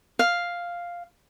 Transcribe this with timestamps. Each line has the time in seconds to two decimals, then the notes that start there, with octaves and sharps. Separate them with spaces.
0.19 F5